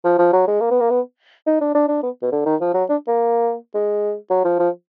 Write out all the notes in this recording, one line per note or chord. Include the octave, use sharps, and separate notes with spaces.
F3
F3
F#3
G#3
A#3
B3
A#3
B3
D#4
D4
D4
D4
B3
B2
D3
D#3
F3
F#3
D4
A#3
G#3
F#3
F3
F3